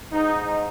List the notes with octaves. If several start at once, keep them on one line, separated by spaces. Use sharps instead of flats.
G#2 G#3 D#4